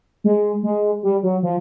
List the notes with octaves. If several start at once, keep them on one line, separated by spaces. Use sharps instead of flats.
G#3
G#3
G3
F#3
F3